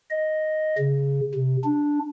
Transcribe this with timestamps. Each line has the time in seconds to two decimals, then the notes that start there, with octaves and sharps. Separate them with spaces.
0.10 D#5
0.78 C#3
1.34 C3
1.64 D4